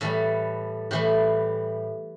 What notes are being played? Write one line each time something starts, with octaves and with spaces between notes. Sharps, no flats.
A2 E3 G3 A4
A2 E3 G3 G4